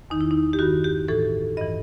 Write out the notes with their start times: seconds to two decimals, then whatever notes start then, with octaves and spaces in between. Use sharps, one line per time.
0.10 E2 D#3 D#4
0.21 E4
0.31 D#4
0.53 G4
0.59 G2 D#3 F#4
0.84 G4
1.08 A2 E3 A4
1.57 G2 D#5
1.61 E3